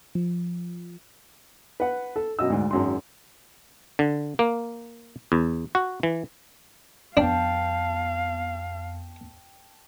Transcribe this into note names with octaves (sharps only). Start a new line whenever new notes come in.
F3
B4 F#5
A4
F#2 B2 D#5 E6
D2 G#2
G#1 F#2 C6
D3
A#3
E2
F#4
E3
F2 B3 D4 F5 G5 A5